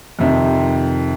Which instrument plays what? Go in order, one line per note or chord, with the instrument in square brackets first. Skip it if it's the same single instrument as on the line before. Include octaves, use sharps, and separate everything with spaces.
[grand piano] F2 C3 D#3